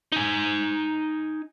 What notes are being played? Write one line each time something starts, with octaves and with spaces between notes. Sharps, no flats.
D#4 G#5